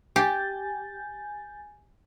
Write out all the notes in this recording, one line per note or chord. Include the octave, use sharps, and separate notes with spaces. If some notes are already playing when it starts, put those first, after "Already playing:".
G4 G#5 G6 A6